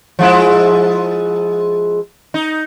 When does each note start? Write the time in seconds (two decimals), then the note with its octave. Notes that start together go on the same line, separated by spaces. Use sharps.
0.19 F3 G#3 E4
2.34 D#4